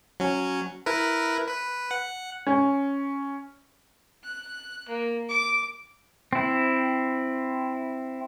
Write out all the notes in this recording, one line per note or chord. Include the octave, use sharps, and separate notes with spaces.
F#3 C#4
E4 A#4 B4
B4
F#5
C#4
F#6
A#3
D6
C4 E4